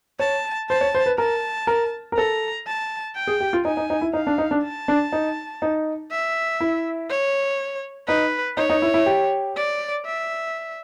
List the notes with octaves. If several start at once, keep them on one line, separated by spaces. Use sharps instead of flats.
C#5 A5
C5 A5
C#5
C5
B4
A#4 A5
A#4
A#4
A4 A#5
A5
G5
G#4
G4
F4
D#4 G#5
D#4
D#4
E4
D#4 F5
D4
D#4
D4
A5
D4
D#4
D#4
E5
E4
C#5
D#4 B4
D#4 C#5
D#4
E4
E4
G4
D5
E5